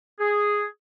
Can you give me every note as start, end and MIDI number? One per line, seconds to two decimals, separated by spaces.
0.19 0.65 68